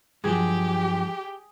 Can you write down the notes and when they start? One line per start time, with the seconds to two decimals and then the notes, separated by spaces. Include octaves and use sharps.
0.24 G2 F3 F#3 G4 G#4